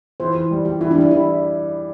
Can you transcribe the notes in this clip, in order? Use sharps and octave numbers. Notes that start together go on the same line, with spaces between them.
E3 C5
E3
G3
G3 G4
E3 E4
D4
G3
E4
E3 E4